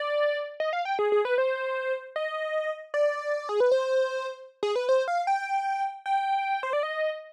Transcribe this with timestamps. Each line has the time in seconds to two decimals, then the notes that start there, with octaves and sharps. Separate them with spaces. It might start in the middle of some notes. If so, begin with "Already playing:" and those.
Already playing: D5
0.60 D#5
0.73 F5
0.85 G5
0.99 G#4
1.12 G#4
1.25 B4
1.38 C5
2.16 D#5
2.94 D5
3.49 G#4
3.60 B4
3.72 C5
4.63 G#4
4.76 B4
4.89 C5
5.08 F5
5.27 G5
6.06 G5
6.63 C5
6.73 D5
6.83 D#5